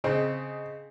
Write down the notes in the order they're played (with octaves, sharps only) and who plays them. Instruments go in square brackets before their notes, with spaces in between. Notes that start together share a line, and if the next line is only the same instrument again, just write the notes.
[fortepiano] C#3 C4 [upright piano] D#5